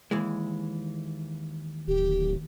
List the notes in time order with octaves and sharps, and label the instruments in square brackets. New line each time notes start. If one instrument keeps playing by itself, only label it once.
[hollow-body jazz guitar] D#2 E3 G#3
[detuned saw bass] D1 [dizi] G4